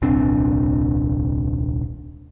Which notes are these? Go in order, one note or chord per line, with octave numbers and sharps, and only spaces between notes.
D#1 C2 C4 D4